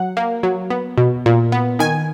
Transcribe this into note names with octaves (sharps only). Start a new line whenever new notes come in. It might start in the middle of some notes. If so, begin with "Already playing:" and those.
Already playing: F#3 F#5
A#3
F#3
B3
B2
A#2
B3
D#3 G#5